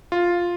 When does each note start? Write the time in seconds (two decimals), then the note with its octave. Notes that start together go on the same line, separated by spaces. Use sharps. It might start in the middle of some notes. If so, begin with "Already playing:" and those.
0.12 F4